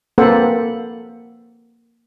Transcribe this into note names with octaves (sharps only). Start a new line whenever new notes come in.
A#3 C4 A4 B4 C5 F#5